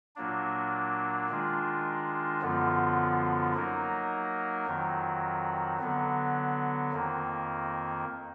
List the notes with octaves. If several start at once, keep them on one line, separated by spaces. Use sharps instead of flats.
A#2 F#3 A#3 D4
D#3 G#3 D4 F4
F#2 D3 F3 B3 F4
F#3 A#3 D#4 A#4
F2 D#3 F#3
D3 F#3 B3
F2 D#3 A#3